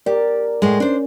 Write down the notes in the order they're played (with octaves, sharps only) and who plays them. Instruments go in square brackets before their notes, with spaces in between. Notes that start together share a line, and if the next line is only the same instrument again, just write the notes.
[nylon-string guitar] G4 [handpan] A#4 D5
[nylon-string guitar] A2 G#3
[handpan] C#4 [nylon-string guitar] D4 C5